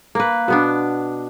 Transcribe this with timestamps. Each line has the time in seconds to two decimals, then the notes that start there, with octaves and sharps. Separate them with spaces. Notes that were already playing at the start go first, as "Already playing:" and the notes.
0.15 A#3 B4
0.48 B2 B3 D4